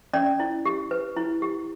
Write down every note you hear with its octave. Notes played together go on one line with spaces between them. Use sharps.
C#4 D5
E4
G4
B4
E4
G4